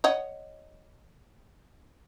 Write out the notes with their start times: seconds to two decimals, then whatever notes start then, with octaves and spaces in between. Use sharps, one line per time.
0.04 C#5 D#5 F#5